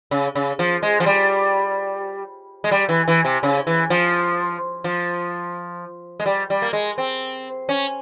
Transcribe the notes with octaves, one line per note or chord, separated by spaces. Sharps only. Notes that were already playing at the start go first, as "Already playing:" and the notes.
C#3
C#3
F3
G#3
F3
G3
G#3
G3
E3
E3
C3
C#3
E3
F3
F3
G#3
G3
G3
A#3
G#3
C4
C#4